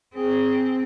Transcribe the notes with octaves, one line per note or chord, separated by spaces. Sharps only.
C4 G#4